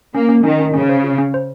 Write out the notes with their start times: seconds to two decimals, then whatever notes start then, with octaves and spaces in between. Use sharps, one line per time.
0.15 A#3 C#4
0.29 C#4
0.44 D#3 C#4
0.60 C#4
0.74 C#3 C#4
0.89 C5
1.04 F4
1.18 C#4
1.34 C5